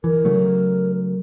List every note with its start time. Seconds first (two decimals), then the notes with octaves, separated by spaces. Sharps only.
0.04 E3 A#4
0.25 C#3 F#3 A3